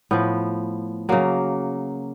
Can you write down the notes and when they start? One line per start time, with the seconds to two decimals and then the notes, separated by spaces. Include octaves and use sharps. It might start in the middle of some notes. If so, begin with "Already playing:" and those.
0.11 A2 F3 B3
1.09 C#3 F#3 A#3